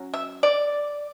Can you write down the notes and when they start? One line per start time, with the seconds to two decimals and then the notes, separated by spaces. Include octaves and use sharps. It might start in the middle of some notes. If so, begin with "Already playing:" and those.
Already playing: F#3 C#4
0.14 E5
0.43 D5